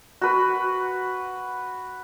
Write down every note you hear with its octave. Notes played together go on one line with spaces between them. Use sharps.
F#4 B4